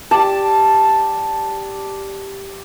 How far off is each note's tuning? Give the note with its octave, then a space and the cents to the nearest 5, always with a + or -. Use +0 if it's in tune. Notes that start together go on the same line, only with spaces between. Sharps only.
G4 +0 D5 +0 A5 +0